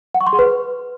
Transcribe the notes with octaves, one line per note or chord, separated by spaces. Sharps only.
F#5
C#6
C6
G#4
B4